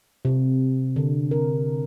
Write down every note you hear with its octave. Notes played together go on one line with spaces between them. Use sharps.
C3
D3
A#4